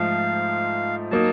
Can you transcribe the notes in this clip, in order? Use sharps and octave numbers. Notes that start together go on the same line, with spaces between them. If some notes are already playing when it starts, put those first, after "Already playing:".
Already playing: G#2 F3 A3 F5
F#3 A#3 D#4 A5